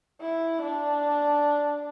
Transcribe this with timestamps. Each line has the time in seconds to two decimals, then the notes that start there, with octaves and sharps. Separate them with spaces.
0.21 E4
0.62 D4